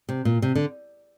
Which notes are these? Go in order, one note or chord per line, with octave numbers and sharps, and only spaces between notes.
C3
A#2
C3
D3